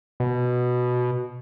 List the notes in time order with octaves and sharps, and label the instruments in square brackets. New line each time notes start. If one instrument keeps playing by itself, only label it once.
[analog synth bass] B2